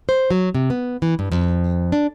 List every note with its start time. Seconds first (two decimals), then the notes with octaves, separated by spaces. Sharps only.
0.09 C5
0.31 F#3
0.55 C3
0.70 B3
1.02 E3
1.19 G2
1.32 F2
1.92 D4